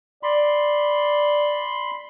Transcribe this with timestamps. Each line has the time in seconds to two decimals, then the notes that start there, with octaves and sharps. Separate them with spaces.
0.23 D5 B5 C6